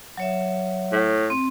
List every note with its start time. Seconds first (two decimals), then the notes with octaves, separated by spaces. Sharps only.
0.17 F#3 C#5 E5
0.92 A2
1.30 C4